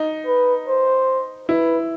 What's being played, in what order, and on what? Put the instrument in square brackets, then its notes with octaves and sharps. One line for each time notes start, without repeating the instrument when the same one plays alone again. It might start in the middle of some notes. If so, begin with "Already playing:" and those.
Already playing: [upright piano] D#4
[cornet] B4
C5
[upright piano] E4 [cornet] B4